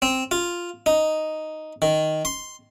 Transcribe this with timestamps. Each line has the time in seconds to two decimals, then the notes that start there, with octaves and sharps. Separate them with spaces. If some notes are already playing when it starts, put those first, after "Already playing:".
0.02 C4
0.31 F4
0.86 D#4
1.82 D#3
2.25 C6